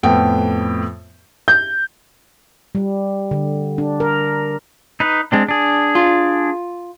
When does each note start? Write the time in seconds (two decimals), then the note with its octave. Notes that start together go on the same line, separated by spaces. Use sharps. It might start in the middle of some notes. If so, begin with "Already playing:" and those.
0.03 F2 A2 B3 G5
1.48 G6
2.75 G3
3.31 D3
3.78 D4
4.00 A#4
5.00 D#4 B4
5.32 G#3 C4 D4
5.49 D4 G#4
5.95 F4